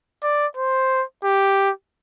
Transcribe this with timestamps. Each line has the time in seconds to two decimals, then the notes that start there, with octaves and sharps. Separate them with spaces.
0.23 D5
0.57 C5
1.24 G4